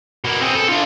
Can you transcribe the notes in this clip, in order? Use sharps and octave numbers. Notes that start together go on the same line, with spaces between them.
B2 A#3
C4 G#4
A4
D4 F4